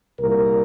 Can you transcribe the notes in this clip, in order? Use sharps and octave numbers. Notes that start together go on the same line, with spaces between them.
C2 A#2 G3 A#4